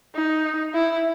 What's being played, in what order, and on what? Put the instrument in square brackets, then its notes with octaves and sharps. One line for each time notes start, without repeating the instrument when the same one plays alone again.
[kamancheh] D#4
E4